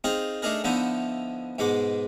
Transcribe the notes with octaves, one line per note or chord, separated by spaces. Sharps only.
C4 D#4 F4 G#4
A3 D4 D#4 G#4 A#4
D3 F3 B3 D#4 E4
G#2 B2 G#3 D6